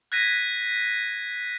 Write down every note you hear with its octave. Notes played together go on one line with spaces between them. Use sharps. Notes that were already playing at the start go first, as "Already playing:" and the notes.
F#6 G#6 A#6 B6 D#7